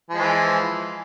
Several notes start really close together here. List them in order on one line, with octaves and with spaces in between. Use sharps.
F3 G#3 E3